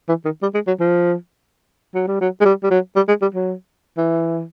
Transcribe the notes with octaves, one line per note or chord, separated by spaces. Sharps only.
E3
D#3
G3
G#3
F#3
F3
F#3
G3
F#3
G#3
G3
G3
F#3
G3
G#3
G3
F#3
E3